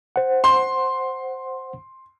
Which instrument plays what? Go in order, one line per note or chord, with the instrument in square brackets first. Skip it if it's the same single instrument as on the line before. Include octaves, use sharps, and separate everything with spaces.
[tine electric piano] C5 F#5
[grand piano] C6